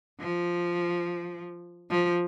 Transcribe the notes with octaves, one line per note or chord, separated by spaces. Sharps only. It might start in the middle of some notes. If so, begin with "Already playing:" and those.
F3
F3